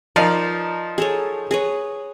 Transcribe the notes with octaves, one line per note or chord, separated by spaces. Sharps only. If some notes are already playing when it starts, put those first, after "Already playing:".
F3 D#4 A#4 B4 D5 F5
G#4 A4 C#5
G#4 B4 C#5